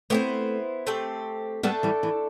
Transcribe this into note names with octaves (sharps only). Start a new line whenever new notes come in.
A3 B3 C4 E4 G4 C5
A3 C4 G4
G3 A3 B3 D4 A4 E5
E3 G3
E3